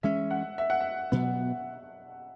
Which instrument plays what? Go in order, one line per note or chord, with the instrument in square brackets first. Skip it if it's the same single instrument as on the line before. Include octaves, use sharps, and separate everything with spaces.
[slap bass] E3 G#3 C#4 [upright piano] E5
[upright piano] F#5
E5
F#5
E5
[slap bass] B2 F#3 B3